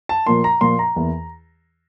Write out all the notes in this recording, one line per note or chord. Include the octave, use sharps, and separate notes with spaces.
A5
A#2 F3 A#3 C6
A#5
A#2 F3 A#3 C6
A#5
E2 E3 A#3